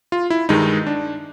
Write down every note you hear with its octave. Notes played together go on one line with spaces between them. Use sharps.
F4
E4
G2 D#3 G#3 D#4
D4